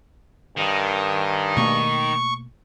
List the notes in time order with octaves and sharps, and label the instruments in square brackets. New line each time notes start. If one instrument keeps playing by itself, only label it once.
[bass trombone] G2 [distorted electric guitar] D#3
[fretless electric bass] B2 A3 A#3 [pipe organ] C#6